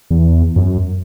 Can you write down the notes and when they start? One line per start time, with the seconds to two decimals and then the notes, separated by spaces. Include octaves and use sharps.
0.11 E2
0.56 F#2